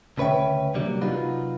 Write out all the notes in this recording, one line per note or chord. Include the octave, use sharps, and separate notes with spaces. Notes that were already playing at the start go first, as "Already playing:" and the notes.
D2 C#3 B4 C#5 E5 G5
C3 F#3 G3 A#3 D4
C3 F#3 D#4 F4 F#4 B4